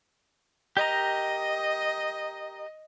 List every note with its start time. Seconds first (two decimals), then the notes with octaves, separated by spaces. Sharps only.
0.77 G4 A#4 D#5 A#5